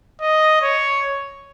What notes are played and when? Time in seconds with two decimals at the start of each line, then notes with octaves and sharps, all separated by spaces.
0.21 D#5
0.62 C#5